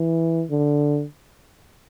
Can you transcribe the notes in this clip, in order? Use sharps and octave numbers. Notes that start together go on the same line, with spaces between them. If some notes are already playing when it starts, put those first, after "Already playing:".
Already playing: E3
D3